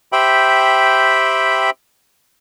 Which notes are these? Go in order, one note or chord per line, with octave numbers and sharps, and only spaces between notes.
G4 C5 E5 G5 B5